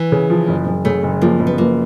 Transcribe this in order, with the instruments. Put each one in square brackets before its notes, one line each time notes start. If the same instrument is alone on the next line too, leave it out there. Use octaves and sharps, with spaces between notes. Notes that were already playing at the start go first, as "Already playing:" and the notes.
Already playing: [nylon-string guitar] E3
[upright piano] C#3
F3
F#1
F#1
[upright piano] C#3 [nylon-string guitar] A3
[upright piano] F#1
[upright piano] F3 [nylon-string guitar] A#3
[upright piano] F#1
[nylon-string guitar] B3
[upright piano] F3 [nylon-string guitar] A#3